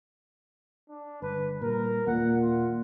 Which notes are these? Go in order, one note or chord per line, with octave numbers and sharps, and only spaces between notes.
D4
G1 B4
A#2 G3 A#4
D#2 A#2 A#3 F#5
F4